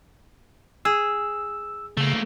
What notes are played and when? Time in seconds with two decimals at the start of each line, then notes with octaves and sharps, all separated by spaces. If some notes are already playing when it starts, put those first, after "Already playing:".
0.85 G#4 E6
1.97 C#3 A3 A#3